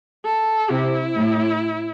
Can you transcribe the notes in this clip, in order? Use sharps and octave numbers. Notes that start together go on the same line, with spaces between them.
A4
C3 E4
A2